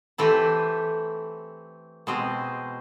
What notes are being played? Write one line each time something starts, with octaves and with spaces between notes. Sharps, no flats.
E3 A3 C4 E4 G4
B2 G#3 C4